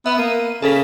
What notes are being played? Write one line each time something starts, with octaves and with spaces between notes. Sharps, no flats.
B3 E5
A#3 D#7
C#3 A4 A#4 B6